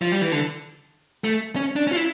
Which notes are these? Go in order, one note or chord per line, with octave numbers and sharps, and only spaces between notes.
F3
G3
E3
D3
A3
C#4
D4
C#4
F4
E4